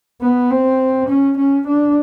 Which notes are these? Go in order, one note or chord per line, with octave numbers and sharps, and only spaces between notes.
B3
C4
C#4
C#4
D4